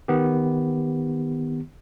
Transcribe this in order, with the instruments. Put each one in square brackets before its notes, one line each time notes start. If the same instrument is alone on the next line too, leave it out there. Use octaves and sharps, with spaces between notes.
[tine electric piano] D#3 B3 G4